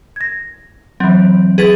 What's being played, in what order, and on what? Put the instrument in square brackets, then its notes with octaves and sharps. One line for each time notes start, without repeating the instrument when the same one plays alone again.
[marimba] G#6 A#6
[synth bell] E3 C4 [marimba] F#3
[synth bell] G#4 B4 A6